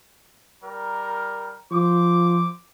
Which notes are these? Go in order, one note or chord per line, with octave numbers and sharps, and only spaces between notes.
G3 A#4
F3 C5 D6